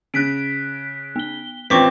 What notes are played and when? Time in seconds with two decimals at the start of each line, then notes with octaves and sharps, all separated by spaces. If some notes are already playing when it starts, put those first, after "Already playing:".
0.14 C#3 F#6 B6 D7
1.16 B3 G7
1.70 A1 C4 F4 B4 C#6 D6 A#6 B6